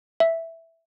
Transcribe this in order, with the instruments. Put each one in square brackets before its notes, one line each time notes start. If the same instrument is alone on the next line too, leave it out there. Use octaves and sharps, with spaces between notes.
[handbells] E5